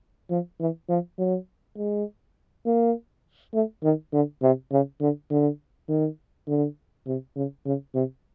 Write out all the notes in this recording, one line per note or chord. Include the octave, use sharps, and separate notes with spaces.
F3
E3
F3
F#3
G#3
A#3
A3
D#3
D3
C3
C#3
D3
D3
D#3
D3
C3
C#3
C#3
C3